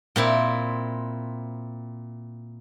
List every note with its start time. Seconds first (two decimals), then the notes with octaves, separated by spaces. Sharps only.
0.16 A#2 C4 E4